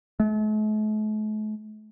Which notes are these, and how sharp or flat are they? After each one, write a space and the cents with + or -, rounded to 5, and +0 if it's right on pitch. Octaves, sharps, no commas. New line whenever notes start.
A3 -45